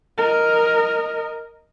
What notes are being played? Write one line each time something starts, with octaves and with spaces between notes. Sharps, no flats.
A#4 D#5